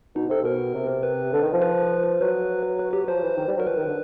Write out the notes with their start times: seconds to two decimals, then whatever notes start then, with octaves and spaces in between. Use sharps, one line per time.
0.16 B2 D#4
0.29 C3 A4
0.43 B2 A#4
0.74 C3
1.03 B4
1.33 D3
1.42 D#3
1.53 F3
1.62 B4
2.21 F#3 B4
2.79 B4
2.93 G4
3.08 F3 C5
3.23 E3
3.38 D#3
3.47 G3
3.57 F#3 A#4
3.67 F3 B4
3.77 D#3
3.86 D3